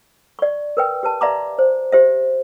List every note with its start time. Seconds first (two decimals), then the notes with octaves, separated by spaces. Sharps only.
0.39 D5 C#6
0.77 A#4 B4 G5
1.03 G4 B4 A5
1.21 D5 E5 F5 A#5 C6 D6
1.59 C5
1.92 G4 C5 E5